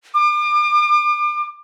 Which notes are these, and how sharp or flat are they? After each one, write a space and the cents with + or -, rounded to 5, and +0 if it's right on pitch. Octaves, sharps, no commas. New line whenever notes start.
D6 +40